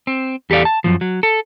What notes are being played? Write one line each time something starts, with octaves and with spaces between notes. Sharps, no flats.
C4
E2 G4 A4 D5 F5
A5
F#2 A#2 F3
F#3
A4